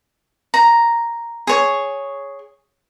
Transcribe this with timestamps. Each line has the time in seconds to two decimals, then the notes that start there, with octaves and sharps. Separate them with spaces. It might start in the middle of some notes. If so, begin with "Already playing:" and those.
0.54 A#5
1.47 G#4 C#5